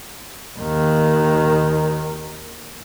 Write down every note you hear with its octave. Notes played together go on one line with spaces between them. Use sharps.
D#2 D#3